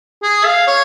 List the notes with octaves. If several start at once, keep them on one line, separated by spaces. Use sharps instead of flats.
G#4
F5
C#5